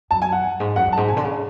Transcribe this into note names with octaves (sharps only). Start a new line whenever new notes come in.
F#2 A5
G#5
F#5
F#2
G#2
F#2 F#5
F#2
A5
G#2
B2 G#5
D3
C#3